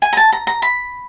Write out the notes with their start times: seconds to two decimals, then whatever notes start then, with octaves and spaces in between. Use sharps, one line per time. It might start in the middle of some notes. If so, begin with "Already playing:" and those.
0.02 G#5
0.13 A#5
0.17 A5
0.32 A#5
0.47 A#5
0.62 B5